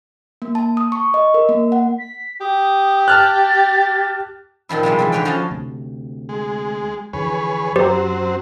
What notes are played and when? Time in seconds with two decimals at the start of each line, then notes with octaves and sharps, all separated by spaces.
0.42 A#3
0.55 A5
0.77 D#6
0.92 C#6
1.14 D#5
1.34 A#4
1.49 A#3
1.72 F#5
1.99 B6
2.41 G4 D#6
3.08 A5 F6 F#6 A6
4.69 A#2 D#3 F3 E4
4.83 C3 F3 G3 G#3
4.99 G#2 C3 E3
5.12 D3 B4 C#5 D5 G5
5.25 F3 C#4 F#4 D#5 F5 A5
5.51 D2 C3
6.29 G#3
7.13 F2 D3 E3 G#4 B4 C#5
7.76 F#2 F#3 C4 G4 C5 A#5